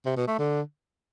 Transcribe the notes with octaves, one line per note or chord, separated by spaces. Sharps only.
C3
B2
A3
D3